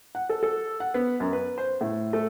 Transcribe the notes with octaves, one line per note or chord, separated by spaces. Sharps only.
F#5
A4
A4
F#5
B3
F#2
B4
C5
A2
A3